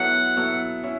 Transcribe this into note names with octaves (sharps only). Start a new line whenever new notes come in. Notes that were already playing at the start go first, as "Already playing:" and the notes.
Already playing: F#3 B3 E4 A4 C#5 F#5
F#3 B3 E4 A4 C#5
C#4 E4